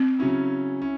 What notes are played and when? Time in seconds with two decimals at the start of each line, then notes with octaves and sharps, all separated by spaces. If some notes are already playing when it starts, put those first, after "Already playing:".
Already playing: C4
0.19 C#3 F#3 C#4 E4
0.82 C#4 E4